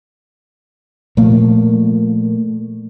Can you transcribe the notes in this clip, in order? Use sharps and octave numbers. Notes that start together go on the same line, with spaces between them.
A#2 F3 A3 A#3